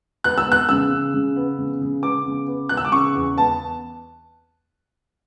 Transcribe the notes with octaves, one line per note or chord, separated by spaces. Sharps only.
B3 F#6
E6
B3 F#6
C#3 E6
C#3
C#3
B3
C#3
C#3
B3 D6
C#3
B3
B3 F#6
E6
D6
C#3 C#6
E2
B3 A5